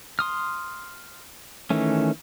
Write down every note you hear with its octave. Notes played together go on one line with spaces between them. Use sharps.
C6 D#6 F6
D#3 E3 A3 C#4